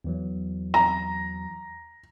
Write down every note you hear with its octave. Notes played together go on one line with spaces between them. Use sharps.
E2 E3 F#3
A#5